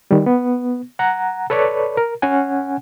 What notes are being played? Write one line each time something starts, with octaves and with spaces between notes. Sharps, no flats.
D#3 G3
B3
F#5 A#5
A4 B4 C#5 D5 B5
A#4
C#4 F#5 G#5